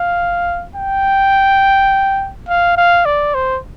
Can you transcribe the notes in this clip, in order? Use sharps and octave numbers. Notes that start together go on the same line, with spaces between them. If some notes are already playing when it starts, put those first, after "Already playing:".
Already playing: F5
G5
F5
F5
D5
C5